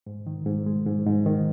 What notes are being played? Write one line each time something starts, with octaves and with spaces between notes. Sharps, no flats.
G#2
D#3
G#2
G#3
G#2
G#2
D#3